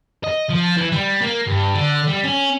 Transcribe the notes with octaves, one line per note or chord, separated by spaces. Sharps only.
D#5
F3
E3
G3
A#3
G2
D3
G3
C#4